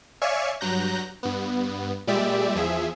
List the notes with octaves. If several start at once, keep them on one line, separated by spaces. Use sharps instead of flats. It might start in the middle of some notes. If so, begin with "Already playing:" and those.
C#5 D5 E5 F5 G#5 C#6
G2 F#3 A#5 F#6 G6 A#6
G2 B3
A#2 G3 G#3 G4 D5 E5
E2 F3 G#4 E5